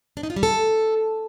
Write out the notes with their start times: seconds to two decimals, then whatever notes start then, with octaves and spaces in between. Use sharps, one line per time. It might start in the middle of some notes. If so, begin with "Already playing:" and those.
0.17 D4
0.23 D#4
0.30 F4
0.36 G3
0.43 A4